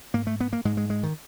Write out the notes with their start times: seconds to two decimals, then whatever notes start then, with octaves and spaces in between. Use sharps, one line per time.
0.14 G#2 A#3
0.27 A3
0.40 B3
0.53 A#3
0.65 G#2 G#3
0.77 G#3
0.90 G#3
1.03 D#3